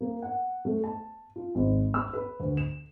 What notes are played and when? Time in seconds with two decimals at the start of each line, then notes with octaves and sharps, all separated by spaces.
0.01 A#3
0.22 F#5
0.65 A3
0.84 A5
1.36 F4
1.55 G#1
1.94 E6
2.13 B4
2.40 D2
2.57 E7